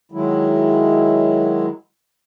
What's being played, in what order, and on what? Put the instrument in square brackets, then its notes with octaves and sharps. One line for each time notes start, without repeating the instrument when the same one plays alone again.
[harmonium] D#3 F#3 G#3 E4